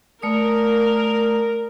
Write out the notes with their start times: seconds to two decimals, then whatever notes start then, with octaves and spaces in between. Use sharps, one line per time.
0.22 A3 A#4 D5 D#6